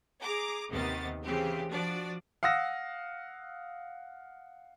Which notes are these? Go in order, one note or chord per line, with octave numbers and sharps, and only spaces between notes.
G#4 A#5 D6
D#2 C3 D#3 B3 D#5 A6
C#3 E3 C4 G4
F3 D4 F#4 D5
F5 F#5 D#6 E6 A#6